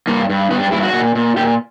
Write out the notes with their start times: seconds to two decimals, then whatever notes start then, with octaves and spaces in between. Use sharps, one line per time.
0.07 G2 A#3
0.29 G2
0.51 G2 B3
0.61 D4
0.72 G2 E4
0.83 F#4
0.93 A#2
1.15 A#2
1.36 A#2 G4